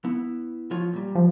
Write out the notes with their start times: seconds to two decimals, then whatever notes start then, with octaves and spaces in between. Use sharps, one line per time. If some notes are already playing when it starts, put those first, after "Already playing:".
0.05 B3 E4
0.71 F3 F4 C#5
0.93 A#2 G3
1.15 F3